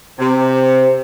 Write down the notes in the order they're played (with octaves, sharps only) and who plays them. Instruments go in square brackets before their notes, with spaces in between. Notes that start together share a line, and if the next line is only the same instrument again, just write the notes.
[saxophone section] C3 [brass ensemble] C5